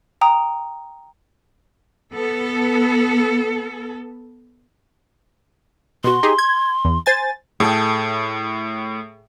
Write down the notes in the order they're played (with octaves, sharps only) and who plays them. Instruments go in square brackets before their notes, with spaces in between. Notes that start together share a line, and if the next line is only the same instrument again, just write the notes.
[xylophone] G5 A#5 D#6
[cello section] B3 A4
[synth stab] B2 F#4 [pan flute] C6
[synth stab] D#4 G4 G#4
G#6
E2
C5 G#5 A6
[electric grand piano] A2 [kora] G#4 A4 G5